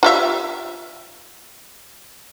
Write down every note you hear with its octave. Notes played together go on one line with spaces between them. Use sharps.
F4 G4 E5